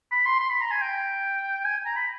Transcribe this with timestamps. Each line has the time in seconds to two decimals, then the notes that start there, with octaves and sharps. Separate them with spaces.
0.12 B5
0.26 C6
0.40 C6
0.51 B5
0.61 A#5
0.71 G#5
0.82 G5
1.65 G#5
1.85 A#5
1.96 B5